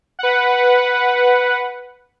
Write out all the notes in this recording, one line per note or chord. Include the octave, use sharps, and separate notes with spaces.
B4 F#5